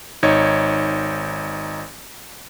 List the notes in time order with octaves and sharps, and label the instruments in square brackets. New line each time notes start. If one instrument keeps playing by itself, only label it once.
[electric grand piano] G#1 D#4 C#5 G#6